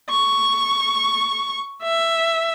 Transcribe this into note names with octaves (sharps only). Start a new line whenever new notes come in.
C#6
E5